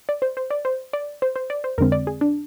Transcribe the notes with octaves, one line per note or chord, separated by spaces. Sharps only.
D5
C5
C5
D5
C5
D5
C5
C5
D5
C5
F2 D3 G#3 C4 A#4
D5
G#4
D4